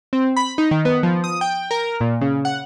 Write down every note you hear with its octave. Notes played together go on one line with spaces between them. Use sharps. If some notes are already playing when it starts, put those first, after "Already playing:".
C4
B5
D#4
D#3
B3
F3
D#6
G5
A#4
A#2
C#3
F#5